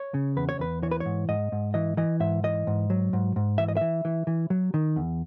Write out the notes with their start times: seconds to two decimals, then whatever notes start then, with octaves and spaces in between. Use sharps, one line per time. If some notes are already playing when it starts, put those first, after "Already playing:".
Already playing: C#5
0.14 C#3
0.36 E2 B4
0.49 C#5
0.59 E2 B4
0.83 E3 C#5
0.91 B4
1.00 C#5
1.06 G#2
1.29 G#2 D#5
1.52 G#2
1.74 E3 D#5
1.97 E3 D#5
2.20 G#2 E5
2.44 E3 D#5
2.67 G#2
2.90 F#3
3.13 G#2
3.36 G#2
3.58 E3 E5
3.68 D#5
3.77 E3 E5
4.05 E3
4.27 E3
4.50 F#3
4.74 D#3
4.96 E2